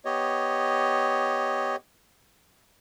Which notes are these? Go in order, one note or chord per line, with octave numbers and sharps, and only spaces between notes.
B3 G4 C#5 D#5